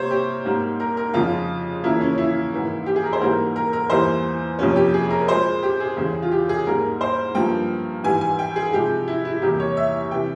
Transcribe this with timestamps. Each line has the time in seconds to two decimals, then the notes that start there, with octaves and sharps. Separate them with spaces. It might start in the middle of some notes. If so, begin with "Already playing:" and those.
Already playing: C3 G3 A#3 C5 C#5
0.11 G4
0.45 G#2 G3 A#3
0.80 A#4
0.97 A#4
1.14 F2 C#3 F3 G#3 F4
1.84 E2 C#3 F3 A#3 E4
2.01 C#4
2.18 E4
2.52 G#2 E3 A#3
2.86 G4
2.96 G#4
3.04 A#4
3.13 C5
3.21 G#2 E3 G3 A#3 A#4
3.56 A#4
3.73 A#4
3.90 E2 E3 G3 A#3 C5
4.59 F2 C3 F3 A#3 C#4
4.76 G4
4.94 G#4
5.11 A#4
5.28 A#2 G#3 C5
5.63 G4
5.80 G#4
5.97 E2 C#3 G3
6.22 F4
6.32 G4
6.49 G#4
6.66 G#2 G3 A#3 A#4
7.01 C5
7.35 G2 F3 A#3 G5
8.04 G#2 E3 G3 G#5
8.21 G#5
8.39 G5
8.56 G#4
8.72 C3 F3 G#3 G4
9.08 E4
9.25 E4
9.42 E2 C3 G3 A#3 G4
9.60 C#5
9.77 E5
10.11 C3 E3 G5